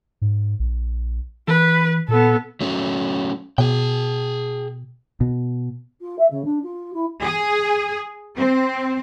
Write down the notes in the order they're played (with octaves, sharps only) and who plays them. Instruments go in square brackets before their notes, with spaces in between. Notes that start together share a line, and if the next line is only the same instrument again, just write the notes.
[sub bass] G#2
A#1
[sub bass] E3 [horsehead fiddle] B4
[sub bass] A#2 [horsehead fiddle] B3 A4
[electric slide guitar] F#3 A3 C#4
[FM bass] B2 [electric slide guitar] G#4 G5
[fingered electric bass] B2
[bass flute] F4
E5
C#3
D4
F4
E4
[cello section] G#4
C4